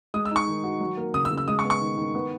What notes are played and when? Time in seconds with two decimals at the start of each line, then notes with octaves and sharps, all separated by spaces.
0.14 G#3 D#6
0.25 E6
0.31 D#4 C#6
0.47 D#3
0.64 F#4
0.81 F#3
0.97 A#3
1.14 C#3 D#6
1.25 E6
1.31 C#3
1.38 E6
1.48 G#3 D#6
1.59 C#6
1.65 B3
1.70 C#6
1.81 D#3
1.97 D#3
2.15 B3